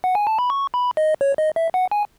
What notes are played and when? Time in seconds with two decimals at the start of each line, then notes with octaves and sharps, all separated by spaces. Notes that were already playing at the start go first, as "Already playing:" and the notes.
0.04 F#5
0.15 G#5
0.27 A5
0.39 B5
0.50 C#6
0.74 B5
0.97 D#5
1.21 C#5
1.38 D#5
1.56 E5
1.74 F#5
1.91 G#5